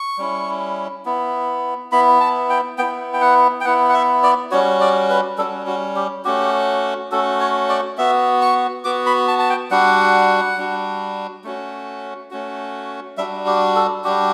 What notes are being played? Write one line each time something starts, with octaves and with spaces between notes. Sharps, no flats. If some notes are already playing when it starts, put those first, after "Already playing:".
Already playing: C#6
G3 C#4 E4
B3 E4
B3 E4 B5
A5
G5
B3 E4 G5
G5
F#5
G5
B3 E4 F#5
F#5
E5
D5
G3 C#4 F#4 C#5
D5
B4
G3 C#4 F#4 A4
F#4
G4
A3 C#4 F#4 G4
A3 C#4 F#4 A4
C#5
D5
B3 F#4 E5
C#6
B3 F#4 D6
B5
A5
A5
G5
G3 D4 F#4 F#5
G3 D4 F#4
A3 C#4 F#4
A3 C#4 F#4
G3 D4 F#4 E5
G4
A4
G3 D4 F#4 G4